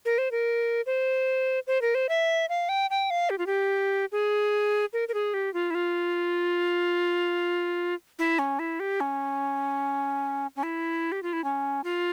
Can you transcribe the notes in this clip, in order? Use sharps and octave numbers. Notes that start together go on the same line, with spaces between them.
A#4
C5
A#4
C5
C5
A#4
C5
E5
F5
G5
G5
F5
G4
F4
G4
G#4
A#4
A#4
G#4
G4
F4
E4
F4
E4
C#4
E4
G4
C#4
C#4
E4
G4
F4
E4
C#4
F4